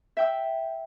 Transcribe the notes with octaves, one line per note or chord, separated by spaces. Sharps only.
E5 G5 E6